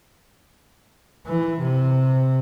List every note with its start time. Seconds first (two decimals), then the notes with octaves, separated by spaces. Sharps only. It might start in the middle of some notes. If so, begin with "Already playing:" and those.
1.26 E3
1.61 C3